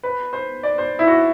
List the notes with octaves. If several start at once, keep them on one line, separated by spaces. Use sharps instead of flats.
B4
C5
D5
C5
E4
F#4